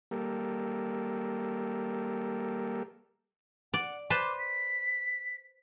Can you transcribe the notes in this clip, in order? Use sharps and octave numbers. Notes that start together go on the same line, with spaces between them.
G3 A#3 G4 A4 A#4
D5 F#5
B4 C5 A5 D6
B6